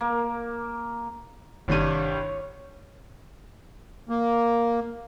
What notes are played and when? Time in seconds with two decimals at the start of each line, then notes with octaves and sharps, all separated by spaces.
0.01 A#3
1.68 G1 C2 G2 D#3 G3 C#5 D#7
4.09 A#3